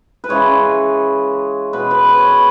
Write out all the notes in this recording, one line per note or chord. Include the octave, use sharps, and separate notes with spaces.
B4
C#3 E3 G#3 C#5
B2 G#3 B4
B4
B4
C#5
B4